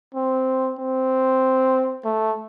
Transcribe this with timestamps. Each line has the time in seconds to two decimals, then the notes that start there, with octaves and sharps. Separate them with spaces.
0.15 C4
0.79 C4
2.05 A3